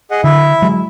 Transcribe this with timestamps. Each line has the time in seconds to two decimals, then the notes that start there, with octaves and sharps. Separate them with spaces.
0.11 G#4 D#5 F#5
0.24 D3 E4 E5
0.62 F#3 G#3